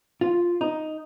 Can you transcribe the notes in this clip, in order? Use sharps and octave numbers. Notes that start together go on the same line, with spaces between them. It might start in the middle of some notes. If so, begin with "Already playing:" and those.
F4
D#4